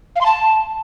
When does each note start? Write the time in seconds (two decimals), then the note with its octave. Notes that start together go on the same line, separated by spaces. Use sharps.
0.16 F5
0.21 C6
0.26 A5